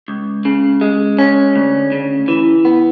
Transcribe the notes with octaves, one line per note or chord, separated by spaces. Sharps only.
C#2
C#3
G#3
C#4
D2
C#3
E3
B3